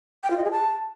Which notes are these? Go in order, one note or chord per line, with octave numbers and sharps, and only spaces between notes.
G5
F4
D#5
G#4
A5